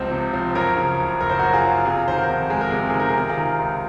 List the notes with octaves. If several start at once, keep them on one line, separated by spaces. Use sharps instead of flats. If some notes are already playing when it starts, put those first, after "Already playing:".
Already playing: C#2 C3 F3 C4 C5 D#5
C3
F3
F#2 A#4 C#5
C#3
F#1
F#1 A#4
C5
F#4 A#4
F#2
F4 G#4
C#3
C3 F4 G#4
D#3 C5
F#4 A#4
F2
G#3 G#4
A#4
C3 G#4
A#4
D#3 G#4
A#4
G#4
C3 A#4
F4 G#4
D#3
C#2